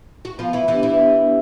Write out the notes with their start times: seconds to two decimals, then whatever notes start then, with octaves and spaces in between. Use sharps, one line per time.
0.25 F#4
0.39 F3 B3 F4
0.53 E3 E4
0.68 E3 D4 E4 G4
0.83 E3 E4
0.98 B3